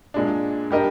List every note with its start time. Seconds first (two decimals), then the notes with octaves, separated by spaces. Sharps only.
0.14 A#2 G#3 D4
0.71 G3 D4 G4 A#4 D#5